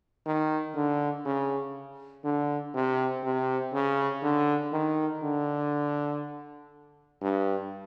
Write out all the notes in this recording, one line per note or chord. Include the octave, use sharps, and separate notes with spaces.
D#3
D3
C#3
D3
C3
C3
C#3
D3
D#3
D3
G2